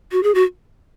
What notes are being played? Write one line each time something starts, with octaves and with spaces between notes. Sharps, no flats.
F#4
G#4
F#4